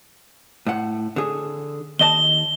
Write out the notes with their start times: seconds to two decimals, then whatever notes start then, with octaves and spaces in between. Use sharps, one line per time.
0.67 A2 F#5
1.16 D3 G#4
1.99 D#2 D#5 A5 G7